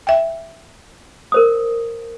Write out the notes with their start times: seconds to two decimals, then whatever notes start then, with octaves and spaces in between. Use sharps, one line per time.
0.07 E5 G5
1.32 A#4 C5 D#6